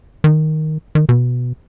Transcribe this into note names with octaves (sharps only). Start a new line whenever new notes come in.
D#3
D#3
B2